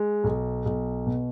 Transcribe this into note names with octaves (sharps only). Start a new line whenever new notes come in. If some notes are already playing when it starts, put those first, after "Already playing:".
Already playing: G#3
B1
B1
B2